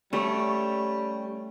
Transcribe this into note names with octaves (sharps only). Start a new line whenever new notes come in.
G3 A3 C#4 G4 C#5